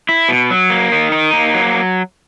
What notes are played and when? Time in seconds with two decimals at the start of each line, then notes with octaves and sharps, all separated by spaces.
0.09 E4
0.29 B2
0.50 F#3
0.70 A#3
0.92 D#3
1.12 D#4
1.33 A#3
1.54 F#3